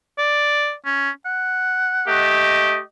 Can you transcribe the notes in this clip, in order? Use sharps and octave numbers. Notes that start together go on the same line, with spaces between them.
D5
C#4
F#5
A3 G4 D#5